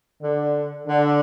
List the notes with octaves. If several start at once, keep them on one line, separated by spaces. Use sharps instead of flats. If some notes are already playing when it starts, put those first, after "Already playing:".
D3
D3